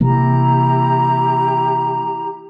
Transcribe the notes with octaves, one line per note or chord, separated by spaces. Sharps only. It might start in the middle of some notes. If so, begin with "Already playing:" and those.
C3 E3 A#3 E4 G4 A#5